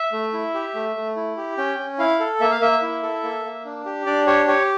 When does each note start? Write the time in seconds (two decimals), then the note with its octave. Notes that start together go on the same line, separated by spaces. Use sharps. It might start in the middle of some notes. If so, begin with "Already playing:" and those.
Already playing: E5
0.12 A3
0.33 E4
0.54 G4
0.75 A3
0.96 A3
1.16 E4
1.37 G4
1.58 C#4 G5
1.78 C#4
1.99 E4 F5
2.20 A4
2.40 A#3 E5
2.51 F5
2.61 A#3 E5
2.82 E4
3.03 A4
3.23 A#3
3.44 A#3
3.65 D4
3.86 G4
4.06 D4 D5
4.27 G4 C#5
4.47 G4 C#5